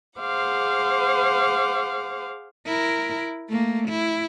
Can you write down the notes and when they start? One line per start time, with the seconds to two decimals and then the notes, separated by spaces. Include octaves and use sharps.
0.19 G#4 C5 F5 F#5 D6
2.66 E4 A#4
3.49 A3 A#3
3.88 E4